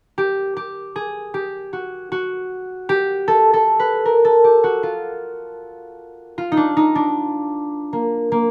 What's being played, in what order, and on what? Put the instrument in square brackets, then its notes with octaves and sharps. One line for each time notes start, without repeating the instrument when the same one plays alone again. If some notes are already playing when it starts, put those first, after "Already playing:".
[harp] G4
G4
G#4
G4
F#4
F#4
G4
A4
A4
B4
A#4
A4
G4
F#4
F4
F4
D#4
D4
D#4
D4
A#3
A#3